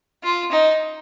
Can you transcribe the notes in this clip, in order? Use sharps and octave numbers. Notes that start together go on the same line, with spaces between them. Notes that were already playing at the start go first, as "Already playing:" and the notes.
F4
D#4